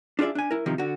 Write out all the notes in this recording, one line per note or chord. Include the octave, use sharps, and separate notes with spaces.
D4 F4 G#4 D5 E5
D4 G#5
E4 A#4
C3 D#3 F3 D#4 E4
D3 F#4